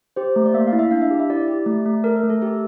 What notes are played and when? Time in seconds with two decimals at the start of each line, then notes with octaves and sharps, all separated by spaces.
0.16 G4 C5
0.36 A3
0.46 D5
0.54 A#3 E5
0.67 F5
0.73 E4
0.79 E5
0.91 D4 F5
1.02 E5
1.11 G4
1.20 E5
1.30 E4 D5
1.48 G4
1.66 A3
1.86 A3
2.04 A4 A#4
2.16 A#4
2.24 A3
2.30 A4
2.42 G4 A4